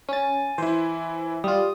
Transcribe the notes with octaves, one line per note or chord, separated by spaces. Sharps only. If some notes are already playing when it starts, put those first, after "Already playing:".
C#4 G#5 A6
E3 E4 C5
G3 F4 D#6